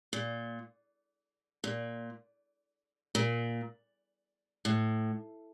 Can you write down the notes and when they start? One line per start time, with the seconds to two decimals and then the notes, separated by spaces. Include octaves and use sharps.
0.13 A#2
1.64 A#2
3.15 A#2
4.65 A2